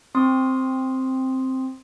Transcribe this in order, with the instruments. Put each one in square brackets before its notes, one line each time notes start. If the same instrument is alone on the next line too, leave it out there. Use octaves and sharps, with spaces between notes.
[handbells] C4 C6 D#6